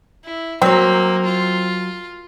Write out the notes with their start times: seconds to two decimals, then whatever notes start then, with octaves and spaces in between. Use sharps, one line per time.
0.24 E4
0.62 F#3 A#3 C4 C#5
1.25 F4